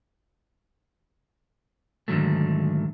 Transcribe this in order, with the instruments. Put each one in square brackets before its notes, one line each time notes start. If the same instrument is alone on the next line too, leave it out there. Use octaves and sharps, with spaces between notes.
[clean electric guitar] G#2 D3 D#3 F#3 A3